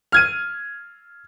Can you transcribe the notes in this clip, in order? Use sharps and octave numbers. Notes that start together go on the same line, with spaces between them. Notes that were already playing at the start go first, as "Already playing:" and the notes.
F6 G#6 D#7